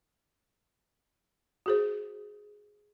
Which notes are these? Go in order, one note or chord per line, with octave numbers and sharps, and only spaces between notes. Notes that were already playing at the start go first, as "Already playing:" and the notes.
F#4 G#4 C5